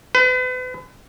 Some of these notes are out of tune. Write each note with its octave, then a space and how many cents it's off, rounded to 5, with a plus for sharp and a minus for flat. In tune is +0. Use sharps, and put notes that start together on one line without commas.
B4 +40